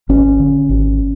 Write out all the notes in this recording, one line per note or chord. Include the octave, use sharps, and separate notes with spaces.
G#1 C#4
D3
G#1